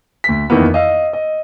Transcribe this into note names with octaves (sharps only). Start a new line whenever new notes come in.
D2 B6
F2 D#3 E3 A#3 B3
D#5 F5 E6
D#5